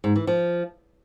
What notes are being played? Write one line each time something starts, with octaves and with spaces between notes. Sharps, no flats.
G#2
E3
F3